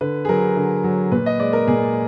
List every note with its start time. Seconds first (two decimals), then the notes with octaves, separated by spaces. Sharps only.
0.01 D3 B4
0.25 G#4
0.29 F#3 A#4
0.57 D3
0.84 F#3
1.12 A#2 B4
1.26 D#5
1.40 G#3 D5
1.53 A#4
1.68 A#2 G#4